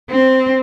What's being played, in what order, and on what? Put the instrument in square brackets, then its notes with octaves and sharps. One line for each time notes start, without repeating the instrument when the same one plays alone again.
[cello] C4